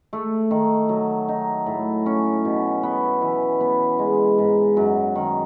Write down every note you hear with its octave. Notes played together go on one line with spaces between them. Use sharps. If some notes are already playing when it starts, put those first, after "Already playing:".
A3
D#3
F#3
D#4
A2
C#4
B2
B3
E3
B3
G#3
G#2
F#2
D#3